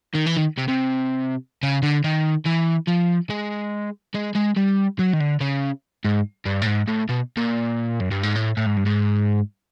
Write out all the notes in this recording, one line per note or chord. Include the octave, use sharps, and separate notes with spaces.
D#3
E3
D#3
C3
C3
C#3
D3
D#3
E3
F3
G#3
G#3
G#3
G3
F#3
D#3
D3
C#3
G#2
G2
A2
G#2
A2
B2
A#2
F#2
G2
G#2
A2
A2
G#2
G2
G#2